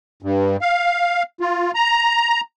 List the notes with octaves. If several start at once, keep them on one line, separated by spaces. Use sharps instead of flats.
G2
F5
F4
A#5